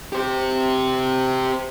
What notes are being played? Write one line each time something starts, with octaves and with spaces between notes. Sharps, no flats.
G4 C5